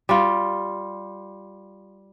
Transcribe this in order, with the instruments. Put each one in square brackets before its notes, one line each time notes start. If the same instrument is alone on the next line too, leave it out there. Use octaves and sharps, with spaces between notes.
[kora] G3 F4